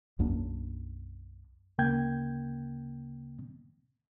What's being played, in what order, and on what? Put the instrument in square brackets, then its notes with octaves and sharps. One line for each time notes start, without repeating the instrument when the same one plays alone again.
[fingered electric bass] B1 F#2 A#3 D4
[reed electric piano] D2 C#3 A#3 G5 G6 G#6